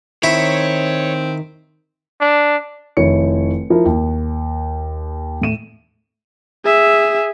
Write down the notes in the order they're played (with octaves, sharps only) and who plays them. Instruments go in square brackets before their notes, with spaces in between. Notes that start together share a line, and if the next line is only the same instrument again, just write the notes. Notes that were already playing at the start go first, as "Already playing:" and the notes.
[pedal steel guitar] D#3 [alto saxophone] C4 [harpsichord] E4 [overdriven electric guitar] C#5
[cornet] D4
[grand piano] F1 D#3 E4 C#5 C#7
F3 E4 A#4
D#2
A2 A3 D#7 E7
[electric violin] G#4 E5